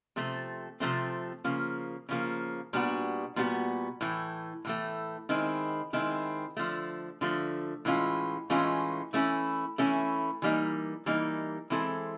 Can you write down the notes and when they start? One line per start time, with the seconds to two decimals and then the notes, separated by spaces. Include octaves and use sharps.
0.16 C3 F3 A3 C4
0.80 C3 F3 A3 C4
1.44 C#3 F3 A#3
2.09 C#3 F3 A#3
2.73 A#2 G3 B3 D4 F#4
3.36 A#2 G3 B3 D4 F#4
4.01 A2 E3 A3
4.65 A2 E3 A3
5.29 D#3 G#3 C4 E4
5.93 D#3 G#3 C4 E4
6.57 D3 F3 A3
7.21 D3 F3 A3
7.85 A2 E3 G#3 C#4 F4
8.50 A2 E3 G#3 C#4 F4
9.13 E3 A3 C#4 E4
9.78 E3 A3 C#4 E4
10.42 E3 G3 A#3 D#4
11.06 E3 G3 A#3 D#4
11.70 E3 G#3 C4 E4 A4